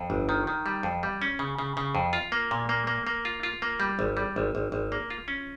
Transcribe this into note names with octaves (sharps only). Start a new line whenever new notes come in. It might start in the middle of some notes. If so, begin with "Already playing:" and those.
Already playing: F2
G1
D#3
D#3
G3
F2
G3
C#4
C#3
C#3
C#3
F2
F4
A#3
A#2
A#3
A#3
A#3
F4
F4
A#3
G3
G#1
G3
G#1
G#1
G#1
A#3
F4
C#4